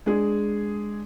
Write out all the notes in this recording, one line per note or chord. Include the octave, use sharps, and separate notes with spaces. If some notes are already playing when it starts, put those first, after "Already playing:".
G#3 D4 G#4